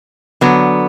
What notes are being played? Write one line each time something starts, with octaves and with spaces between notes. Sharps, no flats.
D3 F#3 B3